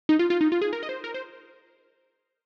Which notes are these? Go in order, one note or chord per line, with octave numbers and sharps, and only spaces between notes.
D#4
F4
F4
D#4
F4
G#4
A#4
D#5
C5
A#4
C5